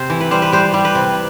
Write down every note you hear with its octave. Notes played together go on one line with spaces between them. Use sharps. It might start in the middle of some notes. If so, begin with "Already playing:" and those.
Already playing: C3 C5
E3
B4
G3 C5
B4
G3 C5
G3
B4
C3